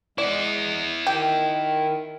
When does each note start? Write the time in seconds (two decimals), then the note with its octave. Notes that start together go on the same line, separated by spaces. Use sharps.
0.18 G#3 E4 D5 F#5
1.07 D#3 G4